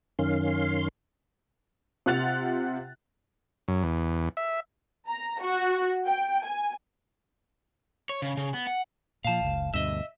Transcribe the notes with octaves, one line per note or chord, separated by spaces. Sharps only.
F#2 D#3 C#4 F5 C6
C3 F4 F#5 F#6 A6 F7
F#2
E2
E5
A#5
F#4
G5
G#5
C#5
C#3
C#3
B3
F#5
A#2 F3 F5 A5
F#1 C#2
D2 G2 B2 D#5 E5